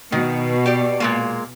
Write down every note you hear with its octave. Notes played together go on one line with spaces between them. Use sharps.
B2 D#3
G4 D5
A#2 G#3 A#3